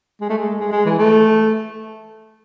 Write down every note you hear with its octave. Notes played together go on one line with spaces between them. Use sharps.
G#3
A3
G#3
G#3
G#3
E3
A3